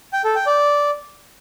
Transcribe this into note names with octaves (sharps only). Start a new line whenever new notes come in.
G5
A4
G5
D5